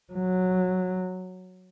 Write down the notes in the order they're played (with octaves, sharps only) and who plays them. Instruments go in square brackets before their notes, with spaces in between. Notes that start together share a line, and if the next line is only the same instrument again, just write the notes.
[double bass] F#3